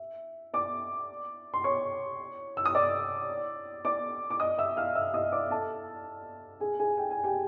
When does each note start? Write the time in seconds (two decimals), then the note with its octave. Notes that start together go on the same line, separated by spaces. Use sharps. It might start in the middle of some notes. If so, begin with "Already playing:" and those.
Already playing: E5
0.53 D5 D6
1.54 C6
1.64 C#5 C#6
2.57 E6
2.66 D#6
2.75 D5 D6
3.85 D5 D6
4.30 D6
4.40 D#5 D#6
4.58 E5 E6
4.77 F5 F6
4.95 E5 E6
5.14 D#5 D#6
5.32 D5 D6
5.50 A4 A5
6.60 G#4 G#5
6.79 G#4 G#5
6.98 G5
7.11 G#5
7.24 G4 G5